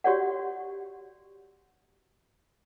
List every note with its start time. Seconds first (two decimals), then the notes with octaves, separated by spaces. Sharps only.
0.04 F#4 G4 C#5 D5 F#5